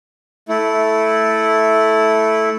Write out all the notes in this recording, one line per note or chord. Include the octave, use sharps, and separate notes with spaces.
A3 E4